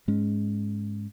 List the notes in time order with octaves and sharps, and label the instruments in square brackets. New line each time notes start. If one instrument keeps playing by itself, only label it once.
[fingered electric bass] G#2 G#3 C#4